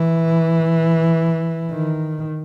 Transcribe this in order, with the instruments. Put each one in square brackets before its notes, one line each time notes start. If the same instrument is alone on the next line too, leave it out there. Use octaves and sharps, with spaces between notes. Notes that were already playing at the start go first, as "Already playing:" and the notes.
Already playing: [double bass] E3
D#3